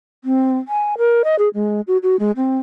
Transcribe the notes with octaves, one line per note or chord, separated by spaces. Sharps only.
C4
G#5
A#4
D#5
G#4
G#3
F#4
F#4
G#3
C4